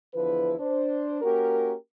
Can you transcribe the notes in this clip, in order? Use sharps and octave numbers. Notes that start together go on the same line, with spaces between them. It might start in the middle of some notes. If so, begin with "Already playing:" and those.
E2 D3 F3 E4 B4
D4 C5
A#3 C#4 F#4 G4 A#4